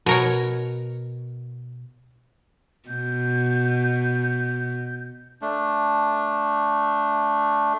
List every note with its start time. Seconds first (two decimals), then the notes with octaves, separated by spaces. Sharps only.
0.06 B2 A#4 C#5
2.88 B2 G6
5.42 A3 D4